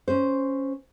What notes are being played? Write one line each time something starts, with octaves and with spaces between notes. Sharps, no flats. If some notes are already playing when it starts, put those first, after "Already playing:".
C#4 C5